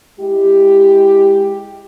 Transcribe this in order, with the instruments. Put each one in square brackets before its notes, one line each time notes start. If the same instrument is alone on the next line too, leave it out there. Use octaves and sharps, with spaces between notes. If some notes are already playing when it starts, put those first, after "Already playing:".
[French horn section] G#3 E4 G4